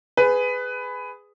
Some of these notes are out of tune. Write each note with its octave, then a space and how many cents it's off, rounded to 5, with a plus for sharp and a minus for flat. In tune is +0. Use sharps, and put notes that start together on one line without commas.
G#4 +0 B4 +15